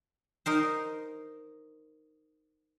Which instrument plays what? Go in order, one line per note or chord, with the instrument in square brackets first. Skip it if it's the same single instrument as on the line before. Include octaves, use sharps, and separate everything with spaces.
[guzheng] D#4 A#4 C5